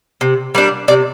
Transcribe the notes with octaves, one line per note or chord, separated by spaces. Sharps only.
C3
G3 A#3 D4
C3 D5